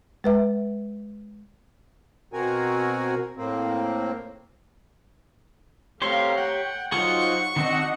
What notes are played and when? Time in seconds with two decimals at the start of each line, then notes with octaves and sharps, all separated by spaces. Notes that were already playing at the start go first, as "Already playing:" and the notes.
0.24 G#3 B4 E5
2.33 B2 C4 F#4 A#4 G#5
3.37 A2 A#3 C4
6.02 A3 C4 G4 C#5 F5 A#5 C6
6.37 F#5 G5
6.92 F#3 D#4 F4 G#4 C5 F#5 C#6
7.56 D#3 C4 D4 F#4 D#5 F#5